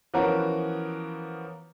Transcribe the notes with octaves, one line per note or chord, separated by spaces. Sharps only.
E3 F3 B3 C#4 F#4 A#4